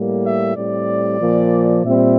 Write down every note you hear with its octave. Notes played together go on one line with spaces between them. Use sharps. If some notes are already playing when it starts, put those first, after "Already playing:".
Already playing: A2 G3 A#3
E5
A2 G3 C4 D5
A#2 F3 A#3
A#2 G3 C4 E5